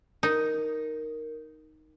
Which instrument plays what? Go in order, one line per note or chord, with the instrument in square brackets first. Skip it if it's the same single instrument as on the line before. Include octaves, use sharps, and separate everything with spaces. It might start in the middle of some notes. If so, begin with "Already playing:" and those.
[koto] D#4 [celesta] A#4